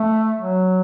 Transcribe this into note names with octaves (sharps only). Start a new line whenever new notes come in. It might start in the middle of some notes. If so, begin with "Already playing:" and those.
Already playing: A3
F#3